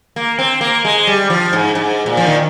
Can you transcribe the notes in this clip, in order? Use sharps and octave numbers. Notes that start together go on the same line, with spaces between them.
A#3
C4
A#3
G#3
G3
F3
G#2
G#2
A#2
F3
D#3